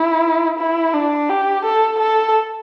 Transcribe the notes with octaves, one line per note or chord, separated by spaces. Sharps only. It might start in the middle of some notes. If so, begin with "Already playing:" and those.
Already playing: E4
E4
D4
G4
A4
A4